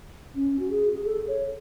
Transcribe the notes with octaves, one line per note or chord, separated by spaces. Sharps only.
C#4
F#4
G#4
G#4
A4
C#5